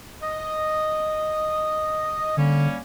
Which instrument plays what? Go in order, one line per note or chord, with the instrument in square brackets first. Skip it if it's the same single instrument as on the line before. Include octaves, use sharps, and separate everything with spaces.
[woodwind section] D#5
[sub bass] D3 [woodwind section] G3 A#3 C#4